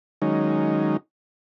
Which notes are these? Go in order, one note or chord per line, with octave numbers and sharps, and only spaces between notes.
D#3 F#3 G#3 C#4 D#4